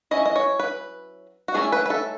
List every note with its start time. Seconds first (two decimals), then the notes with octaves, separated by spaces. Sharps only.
0.11 F#3 C#4 E4 D#5
0.25 D#5
0.36 C#5
0.59 B4
1.48 F#4
1.54 D#3 A3 C#4 E4 G#4
1.72 B4
1.86 B4
1.90 A4